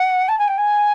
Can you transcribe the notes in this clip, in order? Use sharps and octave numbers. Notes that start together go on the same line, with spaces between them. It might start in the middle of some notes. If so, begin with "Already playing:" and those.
Already playing: F#5
A5
G#5
G5
G#5